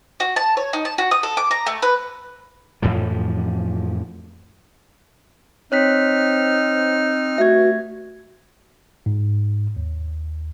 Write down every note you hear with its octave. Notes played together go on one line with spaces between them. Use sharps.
F#4
A5
C#5
D#4
A5
F#4
D#6
A4
D6
A#5
A3
B4
F2 A2 E3 F3
C4 D#4 C#5 F6 F#6 B6
G2 B2 A3 F#4 E5 G#6
G#2
D#2